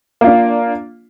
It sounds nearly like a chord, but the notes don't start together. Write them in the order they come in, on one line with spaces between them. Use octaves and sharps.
A#3 F4 D4